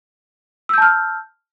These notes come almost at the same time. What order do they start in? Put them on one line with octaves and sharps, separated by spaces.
E6 G6 A5 F6